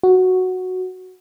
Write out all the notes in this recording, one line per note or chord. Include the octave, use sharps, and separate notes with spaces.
F#4